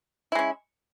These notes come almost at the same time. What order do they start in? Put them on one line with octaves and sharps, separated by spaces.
E4 G#3 C#4